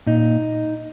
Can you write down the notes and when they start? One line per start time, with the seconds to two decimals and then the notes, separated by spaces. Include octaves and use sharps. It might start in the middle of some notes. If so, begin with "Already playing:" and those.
0.07 A#2 D#4